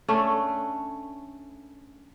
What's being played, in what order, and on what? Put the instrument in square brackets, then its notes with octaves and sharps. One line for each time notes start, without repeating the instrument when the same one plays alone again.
[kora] A3 C#4 D4